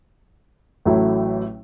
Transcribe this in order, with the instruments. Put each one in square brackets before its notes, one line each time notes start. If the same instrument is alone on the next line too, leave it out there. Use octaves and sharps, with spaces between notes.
[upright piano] A1 A2 F#3 A3 E4